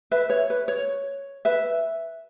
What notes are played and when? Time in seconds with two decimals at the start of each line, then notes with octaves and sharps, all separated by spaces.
0.11 B4 E5
0.30 C#5
0.50 B4
0.68 C#5
1.45 B4 E5